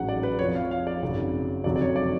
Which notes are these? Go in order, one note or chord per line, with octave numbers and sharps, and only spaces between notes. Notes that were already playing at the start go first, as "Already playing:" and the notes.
Already playing: A1 G#2 F#3 F#5
D5
B4
F2 F3 C#5
F5
F5
D5
G#1 F#2 C#3 F#3
F1 F2 D3 F#3 D5
D5
C#5
D5